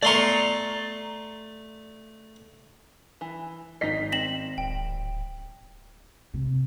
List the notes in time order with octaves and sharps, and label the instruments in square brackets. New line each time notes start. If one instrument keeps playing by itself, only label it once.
[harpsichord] A3 C6 C#6 [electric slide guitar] D5 A#5
[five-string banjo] E3
[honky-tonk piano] G#1 B6 C7 [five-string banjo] D#4 D#5
[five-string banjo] C4 [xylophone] A#6 E7 F#7
[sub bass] D1 [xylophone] G5
[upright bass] C3